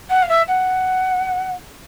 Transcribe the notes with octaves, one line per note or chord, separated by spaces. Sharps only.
F#5
F5
E5
F#5